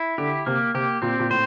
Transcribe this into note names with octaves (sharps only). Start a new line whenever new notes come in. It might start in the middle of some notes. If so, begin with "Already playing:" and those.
Already playing: E4
D3 G4
C3 A#3
C3 G4
A#2 C4
A#2
A2 C5